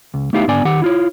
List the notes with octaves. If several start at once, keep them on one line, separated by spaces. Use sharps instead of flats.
C#2
A3 B3 D#4 E4 G4 F5
G#2 D3 B3 D5 G#5
D#3 G4 F#5
E4 F4 C#5